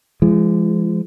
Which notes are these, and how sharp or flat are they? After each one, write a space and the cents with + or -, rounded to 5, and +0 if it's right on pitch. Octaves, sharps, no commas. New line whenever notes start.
F3 -40 G#3 +0